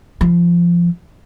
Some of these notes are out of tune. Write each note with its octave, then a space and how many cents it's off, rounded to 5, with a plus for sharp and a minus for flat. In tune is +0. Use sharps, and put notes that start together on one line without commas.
F3 -15